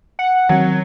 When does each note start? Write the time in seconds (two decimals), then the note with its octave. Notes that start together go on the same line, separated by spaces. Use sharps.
0.19 F#5
0.49 D#3 F#3 C4